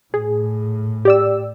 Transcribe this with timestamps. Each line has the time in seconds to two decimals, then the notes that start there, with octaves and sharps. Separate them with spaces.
0.14 A2 G#4
1.05 G4 D5 E6